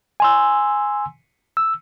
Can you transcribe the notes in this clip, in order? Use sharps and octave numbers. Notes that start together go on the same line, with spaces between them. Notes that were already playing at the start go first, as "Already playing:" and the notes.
G#5 C6 E6
E6